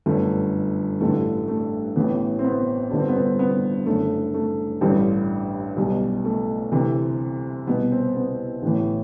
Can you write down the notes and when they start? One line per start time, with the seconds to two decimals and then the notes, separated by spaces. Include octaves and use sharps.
0.06 G1 F#2 D3 A3
1.00 A1 G2 D3 A3
1.48 A3
1.96 A1 A2 E3 B3
2.39 C4
2.44 B3
2.91 G1 G2 D3 D4
2.99 C4
3.09 B3
3.16 C4
3.39 B3
3.86 F#1 F#2 D3 A3
4.34 A3
4.81 A1 G2 D3 G3
5.77 B1 B2 G3
6.25 A3
6.72 D2 C3 E3
7.67 C2 B2 B3
7.92 C4
8.16 B3
8.62 A1 A2 E3